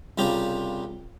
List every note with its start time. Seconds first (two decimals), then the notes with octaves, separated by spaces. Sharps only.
0.18 C2 C#3 G3 F4 G4 A#5